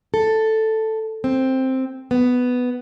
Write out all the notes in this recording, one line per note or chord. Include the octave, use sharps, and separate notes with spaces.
A4
C4
B3